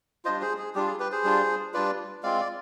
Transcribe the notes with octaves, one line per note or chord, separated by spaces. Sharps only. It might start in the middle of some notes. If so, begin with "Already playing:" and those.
G3 D4 F4 C5 D#5
G#4 C5
G#4
G3 D4 F4 G4
G#4
G4 B4
G#4 C5
G3 D4 F4
G3 D4 F4 B4 D5
G#3 C4 F4 D5 F5
D5